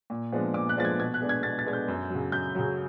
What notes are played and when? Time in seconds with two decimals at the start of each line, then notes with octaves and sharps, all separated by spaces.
0.10 A#2
0.32 F3 G#3 B3 D4
0.54 A#2 D6
0.69 F#6
0.77 F3 G#3 B3 D4 A6
0.85 G#6
0.99 B2 G#6
1.14 F#6
1.21 G#3 B3 D4
1.29 G#6
1.43 B2 A6
1.59 A6
1.65 G#3 B3 D4 G#6
1.73 G6
1.88 F#2
2.10 C#3 F#3
2.32 F#2 G6
2.55 C#3 F#3